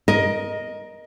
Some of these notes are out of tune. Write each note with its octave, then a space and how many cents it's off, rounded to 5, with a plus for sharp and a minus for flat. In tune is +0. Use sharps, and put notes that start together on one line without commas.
A#4 +20 D#5 +0